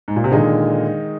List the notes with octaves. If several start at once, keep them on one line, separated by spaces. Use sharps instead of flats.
G#2
A#2
C3
A#2 D3 D#3 G#3 D#4